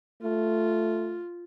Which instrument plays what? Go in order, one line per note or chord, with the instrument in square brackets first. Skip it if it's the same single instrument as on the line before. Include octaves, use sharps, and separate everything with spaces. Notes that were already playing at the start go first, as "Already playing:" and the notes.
[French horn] A3 [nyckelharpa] F4